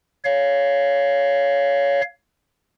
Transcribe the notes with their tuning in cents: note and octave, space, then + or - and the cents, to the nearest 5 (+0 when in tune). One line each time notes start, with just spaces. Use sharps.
C#5 +15 F5 +0